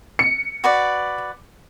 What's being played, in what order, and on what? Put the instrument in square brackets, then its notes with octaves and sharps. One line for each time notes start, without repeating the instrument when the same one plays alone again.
[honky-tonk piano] C#7
[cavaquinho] F#4 B4 D5